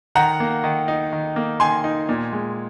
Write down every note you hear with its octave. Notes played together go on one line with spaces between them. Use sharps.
D#3 F#5 A#5
A#3
D#3
D#4
D#3
A#3
D#3 G#5 C6
D#4
A#2
G#3